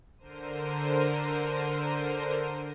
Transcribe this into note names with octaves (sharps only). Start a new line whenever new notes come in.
D3 A#4 C5 D#7